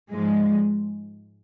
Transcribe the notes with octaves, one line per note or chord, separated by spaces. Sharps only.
G#2 F3 G#3